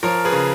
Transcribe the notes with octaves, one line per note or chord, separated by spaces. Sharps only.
F3 A#4 C#5
G#4 B4
C#3